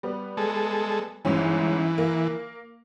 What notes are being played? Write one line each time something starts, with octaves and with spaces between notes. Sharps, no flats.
G3 B3
G#3 A4
G1 G#2 E3 C#4
A#3